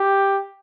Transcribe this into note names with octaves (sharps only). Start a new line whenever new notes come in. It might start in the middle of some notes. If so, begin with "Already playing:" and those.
Already playing: G4